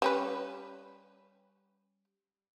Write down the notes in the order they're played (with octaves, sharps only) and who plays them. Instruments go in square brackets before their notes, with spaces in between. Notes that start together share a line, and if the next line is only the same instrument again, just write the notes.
[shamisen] G3 C#4 B4